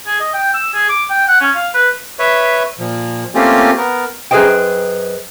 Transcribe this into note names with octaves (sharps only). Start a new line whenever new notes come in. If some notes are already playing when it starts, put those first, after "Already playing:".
G#4
D#5
G5
E6
G#4
D6
G5
F#5
C#4
F5
B4
B4 C#5 E5
A#2 F3
A3 A#3 C4 C#4 F4 G4
B3 A#4
F#2 G#4 B4 C5 D#5 G5